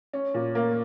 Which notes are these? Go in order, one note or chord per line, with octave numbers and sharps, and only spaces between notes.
C#4
A#2
A#3